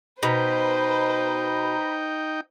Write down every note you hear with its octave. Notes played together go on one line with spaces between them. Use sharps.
B2 D#4 B4 C5 G5 A#5 B5